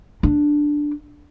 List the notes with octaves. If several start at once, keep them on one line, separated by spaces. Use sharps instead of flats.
D4